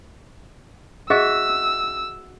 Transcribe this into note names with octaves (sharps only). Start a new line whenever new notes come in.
F#4 G#4 D#5 E5 E6